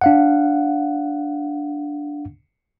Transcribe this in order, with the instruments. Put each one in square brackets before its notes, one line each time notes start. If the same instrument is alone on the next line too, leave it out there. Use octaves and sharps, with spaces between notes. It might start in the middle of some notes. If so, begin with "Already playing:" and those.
[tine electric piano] D4 F5 F#5